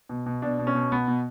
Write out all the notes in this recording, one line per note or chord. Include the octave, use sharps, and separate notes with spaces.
B2
B2
B2 D4
B2
C#4
B2
B2 B3
B2